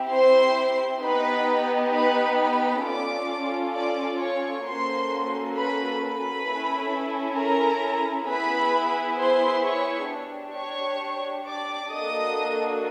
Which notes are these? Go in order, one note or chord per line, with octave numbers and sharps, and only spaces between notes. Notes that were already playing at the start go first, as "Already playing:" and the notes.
Already playing: C4 E4 G4
C5 C6
B3 D#4 G4 B4 B5
B4 B5
B4 B5
C#4 F4 A4 D5 D6
D5 D6
C#5 C#6
A#3 C#4 F#4 A4 C5 C6
B4 B5
B4 B5
C#4 E4 A4
A#4 A#5
B3 E4 G#4 B4 B5
C5 C6
C#5 C#6
D4 G4
C#5 C#6
D5 D6
A#3 D4 F#4 A4 D#5 D#6